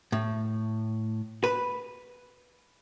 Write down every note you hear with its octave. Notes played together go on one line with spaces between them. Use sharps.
A2
B4